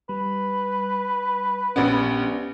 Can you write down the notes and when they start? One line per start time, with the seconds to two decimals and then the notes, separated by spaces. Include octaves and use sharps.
0.09 G3 B4
1.76 A#1 B3 C#4 G4